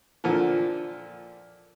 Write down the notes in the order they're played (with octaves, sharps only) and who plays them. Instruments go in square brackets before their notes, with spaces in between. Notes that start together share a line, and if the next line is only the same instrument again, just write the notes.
[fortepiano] A#2 D3 F3